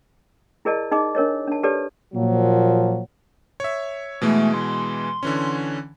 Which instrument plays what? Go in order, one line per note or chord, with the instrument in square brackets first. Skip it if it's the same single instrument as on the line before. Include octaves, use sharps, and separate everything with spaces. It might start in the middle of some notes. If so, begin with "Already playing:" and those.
[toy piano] E4 G#4 A#4 D5 D#5 A5
D#4 G#4 D#5 D6
D4 A#4 C#5 D#5
D4 A5
G4 A4 B4 C#5 D5 A5
[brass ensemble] A#2 F3 F#3
[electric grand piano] C#5 E5
[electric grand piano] B2 E3 G#3 [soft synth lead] A3
[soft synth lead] C6
[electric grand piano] D3 E3 C#4